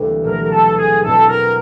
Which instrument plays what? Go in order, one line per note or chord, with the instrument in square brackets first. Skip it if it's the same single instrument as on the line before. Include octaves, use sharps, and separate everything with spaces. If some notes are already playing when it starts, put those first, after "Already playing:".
Already playing: [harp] D2 C3 E3 G3 A#3
[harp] B2 F#3 A3 [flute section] A#4
[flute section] A#4
A4
G#4
[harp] E2 B2 G#3 C4 E4 [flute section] A4
[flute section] A#4